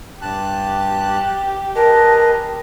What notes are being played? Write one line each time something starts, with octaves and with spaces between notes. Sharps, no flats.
G2 G4 A5 F#6
G#4 A#4 B4 D#5 A5